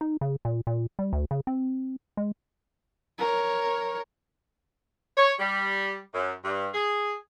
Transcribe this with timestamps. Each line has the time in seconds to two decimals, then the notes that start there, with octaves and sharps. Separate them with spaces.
0.01 D#4
0.21 C#3
0.45 A#2
0.67 A#2
0.99 G3
1.13 D2
1.31 C#3
1.47 C4
2.17 G#3
3.18 A#4 C#5
5.17 C#5
5.39 G3
6.13 F#2
6.43 G2
6.73 G#4